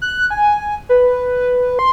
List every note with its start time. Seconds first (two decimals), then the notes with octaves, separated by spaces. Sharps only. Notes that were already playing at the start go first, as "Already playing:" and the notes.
0.02 F#6
0.30 G#5
0.89 B4
1.79 C6